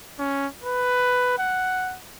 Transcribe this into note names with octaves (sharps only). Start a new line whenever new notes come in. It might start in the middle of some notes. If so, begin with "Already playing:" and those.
C#4
B4
F#5